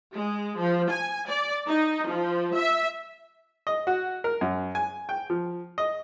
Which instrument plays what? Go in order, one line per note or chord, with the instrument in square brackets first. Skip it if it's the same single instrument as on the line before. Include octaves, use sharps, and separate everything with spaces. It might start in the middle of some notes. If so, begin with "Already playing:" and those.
[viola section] G#3
F3
G#5
D5
D#4
F3
E5
[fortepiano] D#5
F#4
A#4
F#2
G#5
G5
F3
D#5